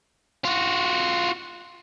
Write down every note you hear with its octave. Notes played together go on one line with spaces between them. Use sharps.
F4 F#4